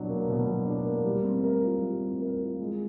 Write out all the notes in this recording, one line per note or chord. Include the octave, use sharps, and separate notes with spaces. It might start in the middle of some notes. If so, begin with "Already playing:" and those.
Already playing: B2 F#3 D4
A#3
B2
F#3
D4
A#3
G3
C4
A#4
F4
G3
C4
A#4
F4
G#3